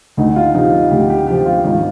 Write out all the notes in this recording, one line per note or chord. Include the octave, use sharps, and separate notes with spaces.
D2 D#4
F4
C3 F3 D#4
D2 G4
G4
C3 F3 G4
F4
G#1 D#4